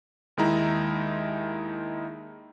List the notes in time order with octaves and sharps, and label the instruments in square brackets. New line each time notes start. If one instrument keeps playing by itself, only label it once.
[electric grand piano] D#2 D#3 G#3 D#4 E4 A#5